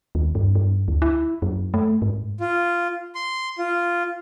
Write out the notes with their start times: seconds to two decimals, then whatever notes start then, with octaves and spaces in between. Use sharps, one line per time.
0.15 D#2
0.35 G2
0.55 G2
0.88 D2
1.02 E4
1.42 F#2
1.74 A3
2.02 G#2
2.40 F4
3.15 C6
3.58 F4